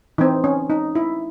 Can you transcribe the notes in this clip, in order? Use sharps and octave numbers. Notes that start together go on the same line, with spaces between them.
E3 C4 D#4
C#4
D#4
E4